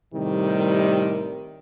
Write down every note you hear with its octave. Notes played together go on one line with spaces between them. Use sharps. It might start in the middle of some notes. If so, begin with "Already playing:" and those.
A2 C3 D#3 G3